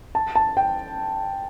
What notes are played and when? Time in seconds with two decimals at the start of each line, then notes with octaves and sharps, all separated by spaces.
0.15 A5
0.35 A5
0.57 G5